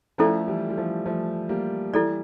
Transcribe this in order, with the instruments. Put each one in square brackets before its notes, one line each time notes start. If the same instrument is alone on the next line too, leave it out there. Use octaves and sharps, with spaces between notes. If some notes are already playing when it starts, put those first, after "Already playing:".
[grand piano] F3 A3 [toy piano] C#4 E4 A4 D5
[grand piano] E3 G3
G3
F3 A3
F3 A3
G3 A#3
[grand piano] E3 G3 [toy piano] E4 A4 D5